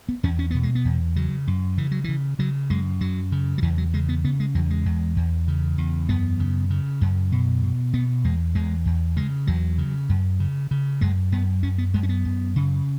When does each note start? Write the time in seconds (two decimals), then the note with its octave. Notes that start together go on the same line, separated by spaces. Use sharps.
0.09 B3
0.23 E2 C#4
0.39 C#4
0.51 B2 B3
0.63 G#3
0.75 B3
0.85 E2
1.16 C#3 F#3
1.47 F#2
1.78 C#3 E3
1.91 F#3
2.04 C#3 E3
2.39 C#3 F#3
2.70 F#2 G#3
3.01 F#2 F#3
3.32 C#3
3.58 F#3
3.62 E2 E3
3.78 F#3
3.93 C#3 G#3
4.09 B3
4.24 C#3 B3
4.40 G#3
4.55 E2 F#3
4.70 G#3
4.86 E2
5.16 E2
5.48 C#3
5.78 E2
6.09 F#2 B3
6.40 C#3
6.70 C#3
7.01 F#2
7.32 B2
7.63 B2
7.93 B2 B3
8.24 E2 G#3
8.55 E2 G#3
8.86 E2
9.16 C#3 G#3
9.47 E2 F#3
9.78 C#3
10.09 F#2
10.40 C#3
10.71 C#3
11.01 F#2 G#3
11.32 F#2 B3
11.63 F#2 C#4
11.78 B3
11.94 F#2 G#3
12.03 C#4
12.09 B3
12.25 F#2
12.56 C#3